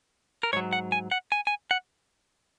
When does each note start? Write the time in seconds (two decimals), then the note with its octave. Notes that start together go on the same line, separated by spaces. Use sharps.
0.43 A#4
0.53 G#2 F#3 C#5
0.73 F#5
0.92 G#5
1.11 F#5
1.32 G#5
1.47 G#5
1.71 F#5